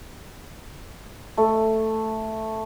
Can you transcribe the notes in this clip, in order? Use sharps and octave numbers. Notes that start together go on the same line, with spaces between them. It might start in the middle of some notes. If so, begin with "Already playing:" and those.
A3